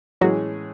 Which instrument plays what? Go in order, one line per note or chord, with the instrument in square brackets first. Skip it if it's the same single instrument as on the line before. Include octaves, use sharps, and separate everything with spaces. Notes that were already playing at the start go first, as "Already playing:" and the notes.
[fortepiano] A2 E3 G#3 C#4 G#4 [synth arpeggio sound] F#3 F#4